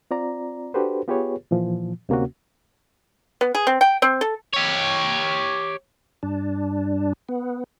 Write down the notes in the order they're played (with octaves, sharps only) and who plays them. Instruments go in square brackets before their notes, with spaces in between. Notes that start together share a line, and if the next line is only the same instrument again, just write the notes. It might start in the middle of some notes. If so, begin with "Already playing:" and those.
[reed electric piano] C4 F4 D5 A#5
D4 F#4 G4 A4 B4 C5
B3 F4 G4 G#4 B4 C#5
A#2 E3 F3
D2 C3 A#3 C#4 F#4
[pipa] B3
G#4
C4
G5
C4
A4
[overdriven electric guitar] G4 C#5
[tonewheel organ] G2 D4
B3